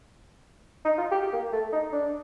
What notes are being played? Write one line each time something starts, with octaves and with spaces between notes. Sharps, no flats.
D#4
F4
G4
A#3
A3
D#4
D4